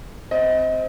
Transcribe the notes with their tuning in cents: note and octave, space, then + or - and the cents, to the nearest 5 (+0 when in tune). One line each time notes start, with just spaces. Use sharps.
C4 -5 D#5 +25